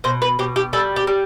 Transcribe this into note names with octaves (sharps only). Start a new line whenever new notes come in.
B2 C5
B4
B2 G4
G4
G3 A4
G4
G3